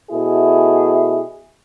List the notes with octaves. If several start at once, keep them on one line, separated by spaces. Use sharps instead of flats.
B2 A3 E4 G#4